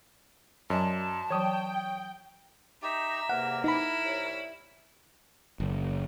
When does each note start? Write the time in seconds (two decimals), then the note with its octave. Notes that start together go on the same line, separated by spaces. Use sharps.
0.70 F#2 F#3 D#5 G#5 A5
1.30 E3 F#3 C#5 G5 D#6
2.82 D#4 G4 E5 A#5
3.30 E2 C3 A#3 A#4 F#5
3.64 D#4 E4 B5
4.05 C2 C#5
5.60 F#1